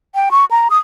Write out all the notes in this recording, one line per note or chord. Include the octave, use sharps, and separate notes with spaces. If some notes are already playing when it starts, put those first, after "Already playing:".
G5
C#6
A#5
D#6